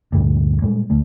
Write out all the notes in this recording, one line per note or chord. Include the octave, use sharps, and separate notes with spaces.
D2 G2 A#2
A#2 G3 G#3
D2 A3